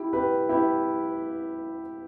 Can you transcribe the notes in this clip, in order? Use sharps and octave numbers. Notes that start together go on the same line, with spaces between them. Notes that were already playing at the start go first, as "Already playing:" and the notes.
Already playing: E4 G4
G4 B4
E4 G4